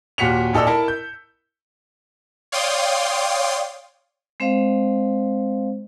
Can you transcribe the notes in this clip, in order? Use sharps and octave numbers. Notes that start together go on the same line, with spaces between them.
D#2 A#2 F#4 B6 C#7 F7
A#2 D#4 A4 D5 E6
E4 A#4 A5
G6
C#5 D5 F5 G5 C6 D#6
G#3 C4 C5 D#5 F5